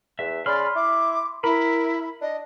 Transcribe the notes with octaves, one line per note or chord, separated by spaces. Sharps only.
E2 E5
C#3 D5 B5 C6 F6
E4 D6
E4 A#4 B5
D4 D#5